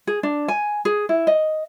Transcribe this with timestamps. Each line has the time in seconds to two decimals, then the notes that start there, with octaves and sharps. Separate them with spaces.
0.07 G#4
0.23 D4
0.48 G#5
0.85 G#4
1.09 E4
1.27 D#5